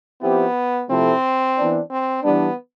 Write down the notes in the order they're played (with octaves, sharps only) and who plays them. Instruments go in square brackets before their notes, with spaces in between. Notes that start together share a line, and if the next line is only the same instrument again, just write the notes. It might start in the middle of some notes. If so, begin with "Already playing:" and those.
[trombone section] F3 C4 E4 G4 [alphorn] B3
[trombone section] C3 F3 A3 E4 A4 [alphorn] C4
[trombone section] E3 B3 D4
[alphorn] C4
[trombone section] E3 G3 D4 [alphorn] B3